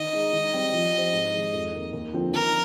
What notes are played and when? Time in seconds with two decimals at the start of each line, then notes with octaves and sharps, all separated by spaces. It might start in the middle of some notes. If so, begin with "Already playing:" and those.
Already playing: D#3 D#5
0.13 G#3 D#4
0.33 D#3
0.54 G3 C4
0.73 F3
0.93 C4 G4 C5
1.13 G#2
1.34 D#3 G#3
1.54 F2
1.73 D#3 A#3
1.93 D#2
2.13 D3 F3 C4 F4
2.32 D#3 A#4